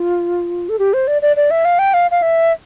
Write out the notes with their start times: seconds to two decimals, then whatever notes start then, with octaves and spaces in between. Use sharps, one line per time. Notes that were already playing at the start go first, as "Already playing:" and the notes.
Already playing: F4
0.69 A4
0.79 G4
0.93 C5
1.07 D5
1.22 D5
1.36 D5
1.51 E5
1.65 F5
1.79 G5
1.94 F5
2.11 F5
2.22 E5